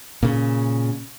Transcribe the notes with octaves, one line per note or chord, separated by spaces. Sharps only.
A#2 C#3